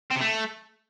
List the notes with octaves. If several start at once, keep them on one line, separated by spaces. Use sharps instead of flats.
C4
C3
A3